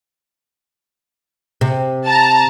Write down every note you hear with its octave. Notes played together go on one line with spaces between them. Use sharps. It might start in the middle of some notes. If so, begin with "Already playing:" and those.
C3
A5 A#5